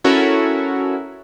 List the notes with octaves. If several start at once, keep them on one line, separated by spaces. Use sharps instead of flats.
C#4 E4 F#4 A4 A#4 C#5